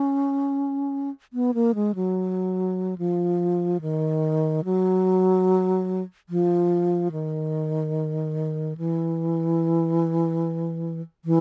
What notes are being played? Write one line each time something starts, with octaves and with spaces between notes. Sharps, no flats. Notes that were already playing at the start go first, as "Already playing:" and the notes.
Already playing: C#4
B3
A#3
G#3
F#3
F3
D#3
F#3
F3
D#3
E3
E3